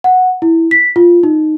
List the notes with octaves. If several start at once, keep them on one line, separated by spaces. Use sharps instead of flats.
F#5
E4
B6
F4
D#4